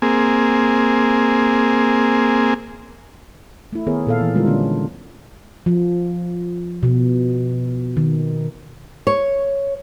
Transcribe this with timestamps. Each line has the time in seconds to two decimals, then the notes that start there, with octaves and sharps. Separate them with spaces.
0.02 A#3 C4 G#4
3.73 A3 E4
3.87 D#3 B3 G#4 A#4 C#5
4.07 A#2 A4 F5
4.20 E3
4.34 D3 G3 G#3 D#4 F4 A#4
4.46 D3 G#3 A#3 C#4 D4
5.66 F3
6.83 B2
7.97 D#3
9.07 C#5